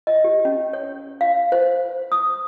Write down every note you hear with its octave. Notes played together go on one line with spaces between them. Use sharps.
D#5
G4
C#4
C#5
F5
C5
D#6